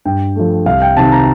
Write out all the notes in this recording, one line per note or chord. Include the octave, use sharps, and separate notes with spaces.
G2 G5
F3 A3
C2 F5
G5
C3 D#3 A5
A#5